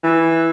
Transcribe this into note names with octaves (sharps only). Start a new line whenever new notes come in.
E3